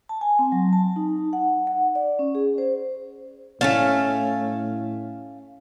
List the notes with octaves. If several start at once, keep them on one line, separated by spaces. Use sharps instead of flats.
A5
G#5
C4
F#3
A5
D#4
F#5
F#5
D5
C#4
G#4
C5
A2 A3 C#4 F5 A5